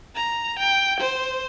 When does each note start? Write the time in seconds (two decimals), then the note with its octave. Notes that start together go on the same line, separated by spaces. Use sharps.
0.15 A#5
0.59 G5
1.00 C5